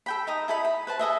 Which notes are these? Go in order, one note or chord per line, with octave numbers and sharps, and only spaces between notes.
A4 G5 B5
D#4 A#5 D#6
E4 A4 D#5 B5
B5
B4 C5 A5
G#4 A4 D#5 E5